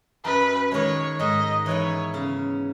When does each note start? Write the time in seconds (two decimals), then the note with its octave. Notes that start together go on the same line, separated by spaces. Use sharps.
0.24 F#2 B4
0.72 D#3 G#3 C#5
1.20 G#2 D#5
1.66 E3 B3 D#4 C#5
2.14 C#3